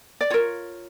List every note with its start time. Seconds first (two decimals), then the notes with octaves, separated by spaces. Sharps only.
0.21 D5
0.30 F4 A#4 C#5